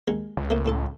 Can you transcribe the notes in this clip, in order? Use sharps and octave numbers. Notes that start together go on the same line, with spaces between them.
D#2 G#3
C#2
A3 A#3 C5
A2 A4 A5